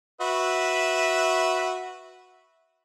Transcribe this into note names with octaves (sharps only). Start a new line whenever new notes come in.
F#4 B4 E5